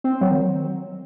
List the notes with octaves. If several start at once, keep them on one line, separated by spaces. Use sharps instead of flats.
C4
F#3
D#3